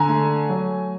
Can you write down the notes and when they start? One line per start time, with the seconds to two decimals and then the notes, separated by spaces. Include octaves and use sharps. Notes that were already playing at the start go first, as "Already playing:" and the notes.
Already playing: D3 G#5 A#5
0.09 A3
0.49 F#3